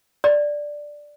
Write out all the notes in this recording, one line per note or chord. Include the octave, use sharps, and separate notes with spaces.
D5